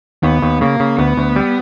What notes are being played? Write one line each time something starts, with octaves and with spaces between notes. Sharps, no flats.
D#2 B3
D#2
C#3 A#3
C#3
D2 B3
D2
G3